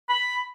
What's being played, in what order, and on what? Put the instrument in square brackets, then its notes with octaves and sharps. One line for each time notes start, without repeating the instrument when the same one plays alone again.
[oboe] B5